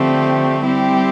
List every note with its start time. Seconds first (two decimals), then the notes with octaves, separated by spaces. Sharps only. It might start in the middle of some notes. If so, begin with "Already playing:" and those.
Already playing: D3 F3 A3 C4 G4
0.64 G3 C4 E4 G4